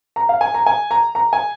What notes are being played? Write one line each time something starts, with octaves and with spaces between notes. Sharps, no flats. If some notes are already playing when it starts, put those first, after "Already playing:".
A#5
F5
G#5
A#5
G#5
A#5
A#5
G#5